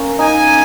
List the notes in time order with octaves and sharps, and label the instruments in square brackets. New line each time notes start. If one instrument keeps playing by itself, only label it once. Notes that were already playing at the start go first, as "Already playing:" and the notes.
Already playing: [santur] A#3 C#4 A#4
[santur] D#4 [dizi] G#5